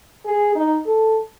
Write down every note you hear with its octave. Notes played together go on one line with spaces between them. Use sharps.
G#4
D#4
A4